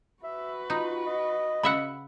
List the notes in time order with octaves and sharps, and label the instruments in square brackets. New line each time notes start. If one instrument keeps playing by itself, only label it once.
[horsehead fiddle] F#4 B4 [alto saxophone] E5
[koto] D#4 [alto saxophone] F4
[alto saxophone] D#5
[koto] C#3 E5 F#5 [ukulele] B5